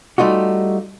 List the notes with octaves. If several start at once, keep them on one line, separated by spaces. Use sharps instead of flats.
G3 A3 D#4 F4 F#4